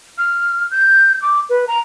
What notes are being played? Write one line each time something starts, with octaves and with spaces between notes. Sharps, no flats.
F6
G6
D6
B4
A#5